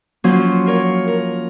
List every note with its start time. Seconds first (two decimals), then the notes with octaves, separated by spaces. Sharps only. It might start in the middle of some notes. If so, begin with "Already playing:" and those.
0.24 F3 F#3 A#3 C#4 F4 C5
0.66 F4 A#4 C#5
1.08 A#4